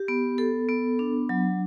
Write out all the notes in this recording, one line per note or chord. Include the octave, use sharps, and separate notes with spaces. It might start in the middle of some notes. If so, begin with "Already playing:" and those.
Already playing: G4
B3
A4
B3
D4
F#3